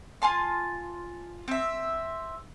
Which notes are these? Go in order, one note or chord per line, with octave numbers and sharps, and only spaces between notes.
F4 G#5 A5 C6
C4 E5